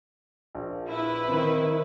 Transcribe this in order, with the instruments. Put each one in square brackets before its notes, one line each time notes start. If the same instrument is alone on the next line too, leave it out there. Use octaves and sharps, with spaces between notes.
[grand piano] A#1
[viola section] E4 B4
[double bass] D#3 [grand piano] C4